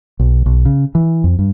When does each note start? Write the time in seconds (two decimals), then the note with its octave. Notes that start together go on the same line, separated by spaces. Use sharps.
0.19 B1
0.46 B1
0.65 C#3
0.95 E3
1.24 F2
1.39 G2